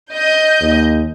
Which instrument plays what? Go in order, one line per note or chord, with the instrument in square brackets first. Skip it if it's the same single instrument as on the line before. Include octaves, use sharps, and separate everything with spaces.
[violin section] D#5 G6
[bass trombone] D#2